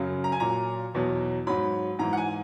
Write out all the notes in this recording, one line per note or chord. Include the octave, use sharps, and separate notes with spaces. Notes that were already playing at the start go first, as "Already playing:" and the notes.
Already playing: F#2 C#3 F#3
A#5
G#5
A#2 F#3 A#5
E2 B2 F#3
G#2 F#3 B5
G#2 E3 A#5
F#5
G#5